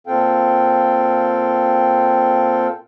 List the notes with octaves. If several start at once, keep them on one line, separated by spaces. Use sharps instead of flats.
A#2 C4 A4 F5 G5